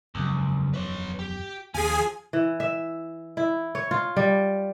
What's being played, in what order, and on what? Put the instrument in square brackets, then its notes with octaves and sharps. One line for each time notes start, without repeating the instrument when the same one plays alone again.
[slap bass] E1 F#2 F3 [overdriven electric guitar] C#2
[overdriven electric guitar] B4 C#5
G4
[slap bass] D#2 [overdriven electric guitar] F3 [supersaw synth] G#4 G#5
[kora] E3
E5
E4
C#5
F4
G3